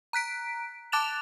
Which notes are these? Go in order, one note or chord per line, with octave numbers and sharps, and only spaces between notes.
A#5 F#6 B6 D7
A5 D6 F#6 A6 E7 F7